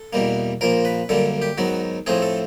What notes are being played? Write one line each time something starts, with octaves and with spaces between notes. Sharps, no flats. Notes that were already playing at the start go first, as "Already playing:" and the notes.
Already playing: A4
E2 B2 G3 A#3
A#1 A#2 F3 A#3 A#4
B4
F#2 D3 G3 A#3 A4
G4
G#2 D#3 F#3 B3 F#4
A2 F3 A3 C4 G#4
A4